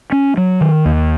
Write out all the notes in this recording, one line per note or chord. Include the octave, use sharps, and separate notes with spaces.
C#4
F#3
D#3
D#2